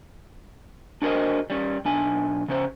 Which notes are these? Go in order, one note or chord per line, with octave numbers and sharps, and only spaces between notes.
D4 F#4 G#4 A#4 C5 D#5
G3 C#4
B1 D4 G#5
C#3 C#4 C5